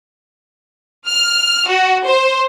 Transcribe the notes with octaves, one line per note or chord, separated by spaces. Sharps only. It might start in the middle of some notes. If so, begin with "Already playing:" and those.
F6
F#4
C5